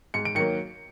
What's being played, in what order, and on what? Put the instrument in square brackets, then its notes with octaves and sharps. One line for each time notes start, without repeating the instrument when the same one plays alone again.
[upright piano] G#2 C#7
D7
D#3 F#3 A#3 C#7